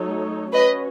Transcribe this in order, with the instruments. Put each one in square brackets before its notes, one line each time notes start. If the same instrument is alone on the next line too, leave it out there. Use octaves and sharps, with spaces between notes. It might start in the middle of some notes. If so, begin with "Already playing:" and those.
Already playing: [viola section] F#3 A3 D#4 A4 C#5
[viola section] C#4 F#4 C#5 [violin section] B4 D#5